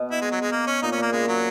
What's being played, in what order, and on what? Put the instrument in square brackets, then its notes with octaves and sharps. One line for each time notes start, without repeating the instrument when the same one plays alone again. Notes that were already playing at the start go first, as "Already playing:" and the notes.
Already playing: [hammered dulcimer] B2
[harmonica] E4
G#3
F#3
G#3
A#3
C#4
[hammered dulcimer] A#2 [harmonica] D#4
[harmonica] C#4
[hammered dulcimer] A#2 [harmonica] A#3
[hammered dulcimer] C#3 [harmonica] G#3
[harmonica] F#3